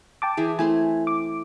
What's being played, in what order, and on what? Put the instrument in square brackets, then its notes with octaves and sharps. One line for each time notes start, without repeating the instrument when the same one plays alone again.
[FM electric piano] G5 A5 D6
[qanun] E3 E4 G#4
[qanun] A3 C4 C6 [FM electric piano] E4 G#5
[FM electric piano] D6